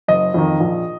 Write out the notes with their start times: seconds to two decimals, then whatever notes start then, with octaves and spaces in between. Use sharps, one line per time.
0.08 F#1 D#5
0.34 F2 D#3
0.60 A#1